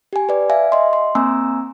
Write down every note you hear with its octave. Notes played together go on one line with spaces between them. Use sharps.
G4 G#5
B4 D5
E5 F5 G#5
D#5 C6
C6
A#3 C4 G#5 A#5 E6